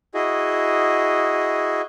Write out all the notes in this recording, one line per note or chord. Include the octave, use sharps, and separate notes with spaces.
E4 F#4 G#4 D#5